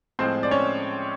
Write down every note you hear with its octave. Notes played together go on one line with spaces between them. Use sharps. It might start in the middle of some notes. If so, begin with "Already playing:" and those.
A2 F3 G#3 C4 C5
D5
C#4 C#5